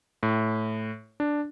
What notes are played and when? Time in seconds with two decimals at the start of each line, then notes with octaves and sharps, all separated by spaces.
0.23 A2
1.20 D4